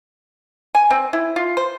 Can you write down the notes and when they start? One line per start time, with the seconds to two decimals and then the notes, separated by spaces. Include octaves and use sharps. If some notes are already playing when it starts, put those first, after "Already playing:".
0.75 G#5
0.90 C4
1.13 E4
1.36 F4
1.57 C5